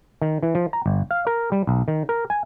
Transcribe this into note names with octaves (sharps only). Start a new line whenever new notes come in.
D#3
E3
F3
A#5
G1
F5
A#4
G3
B1
D#3
A#4
G#5